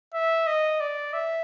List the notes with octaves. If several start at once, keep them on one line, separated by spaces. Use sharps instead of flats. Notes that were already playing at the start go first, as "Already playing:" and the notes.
E5
D#5
D5
E5